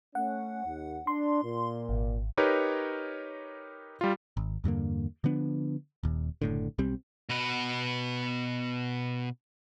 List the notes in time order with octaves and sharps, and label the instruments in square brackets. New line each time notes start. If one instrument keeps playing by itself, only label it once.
[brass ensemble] A3 C#4 [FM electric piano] F#5
[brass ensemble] D#2
[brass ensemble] D4 [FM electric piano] C6
[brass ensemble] A#2
[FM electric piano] G#1
[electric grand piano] D#4 G4 A#4 B4 C#5
G3 F4
[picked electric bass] G#1
E2 G2 D3 A#3
D3 F3 B3 D4
D#1 D#2
F#1 A2 D3
B1 G3 C4
[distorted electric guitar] B2 B4